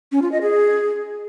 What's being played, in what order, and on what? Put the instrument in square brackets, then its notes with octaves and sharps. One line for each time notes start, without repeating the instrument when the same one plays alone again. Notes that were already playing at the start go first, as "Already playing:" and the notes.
[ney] C#4
F4
D#5
G#4